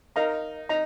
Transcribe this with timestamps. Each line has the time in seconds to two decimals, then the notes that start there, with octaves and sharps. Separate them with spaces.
0.16 D#4 A#4 F5 A#5
0.69 D#4 A#5